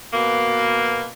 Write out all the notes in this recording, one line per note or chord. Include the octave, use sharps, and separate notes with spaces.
B2 A#3